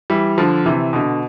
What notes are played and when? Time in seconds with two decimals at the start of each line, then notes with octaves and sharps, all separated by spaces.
0.10 E3 G3
0.38 D3 F3
0.66 C3 E3
0.93 B2 D3